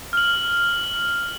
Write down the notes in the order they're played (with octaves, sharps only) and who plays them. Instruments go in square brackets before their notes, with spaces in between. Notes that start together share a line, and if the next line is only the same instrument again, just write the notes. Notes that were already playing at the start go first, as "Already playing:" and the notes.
[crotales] F6 F#7